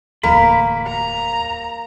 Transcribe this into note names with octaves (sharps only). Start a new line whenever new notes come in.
D1 E2 A#3 B5
A#5